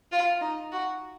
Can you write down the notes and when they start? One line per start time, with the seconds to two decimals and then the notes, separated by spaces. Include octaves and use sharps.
0.12 F4
0.41 D#4
0.72 F#4